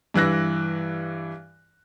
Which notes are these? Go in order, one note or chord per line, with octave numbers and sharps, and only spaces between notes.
G2 E3 E6 F#6 A#6